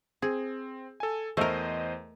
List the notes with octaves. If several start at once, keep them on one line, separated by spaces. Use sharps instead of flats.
C4 G#4
A4 G#5
E2 A3 A#4 C5 D#5